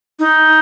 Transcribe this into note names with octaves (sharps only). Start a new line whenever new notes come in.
D#4